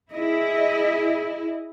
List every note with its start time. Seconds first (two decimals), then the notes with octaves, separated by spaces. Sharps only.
0.11 E4 G#4 D#5